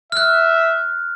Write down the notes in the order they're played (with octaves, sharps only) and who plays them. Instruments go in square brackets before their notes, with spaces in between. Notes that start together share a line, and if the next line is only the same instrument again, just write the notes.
[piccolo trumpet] E5 [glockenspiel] F6 F#6